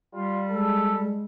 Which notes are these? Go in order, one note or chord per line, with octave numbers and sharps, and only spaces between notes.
G3 F4
G#3 A4
G#3